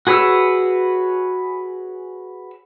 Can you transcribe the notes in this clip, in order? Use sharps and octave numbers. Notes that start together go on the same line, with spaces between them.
F#4 G#4 B4 C#5 E6